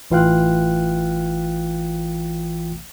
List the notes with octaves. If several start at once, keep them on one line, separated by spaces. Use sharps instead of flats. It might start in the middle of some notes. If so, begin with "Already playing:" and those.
A1 E3 F4 F5 G5 F#6